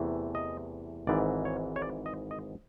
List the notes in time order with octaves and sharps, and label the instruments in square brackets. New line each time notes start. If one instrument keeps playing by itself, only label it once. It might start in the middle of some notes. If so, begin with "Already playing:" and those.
Already playing: [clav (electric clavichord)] E2 C3 E3 A3
D#5
G#1 G#2 E3 D5
C#5
C#5
D5
D#5
D#5